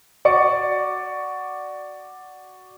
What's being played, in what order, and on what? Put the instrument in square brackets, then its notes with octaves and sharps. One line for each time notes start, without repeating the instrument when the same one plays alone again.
[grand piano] F#4 D5 C#6 C#7